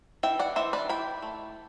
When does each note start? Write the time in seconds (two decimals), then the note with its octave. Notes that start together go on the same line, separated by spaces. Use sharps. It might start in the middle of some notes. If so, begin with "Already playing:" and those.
0.23 E3 E5 G5
0.39 D5 F#5
0.56 E3 C5 E5
0.73 B4 D5
0.89 E4 G5 B5
1.22 A3